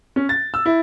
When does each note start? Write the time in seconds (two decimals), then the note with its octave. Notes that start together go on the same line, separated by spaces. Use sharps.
0.16 C#4
0.29 A6
0.54 E6
0.66 E4